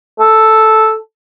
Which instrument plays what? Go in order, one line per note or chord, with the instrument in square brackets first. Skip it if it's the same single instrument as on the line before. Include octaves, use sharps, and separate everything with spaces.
[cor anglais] A4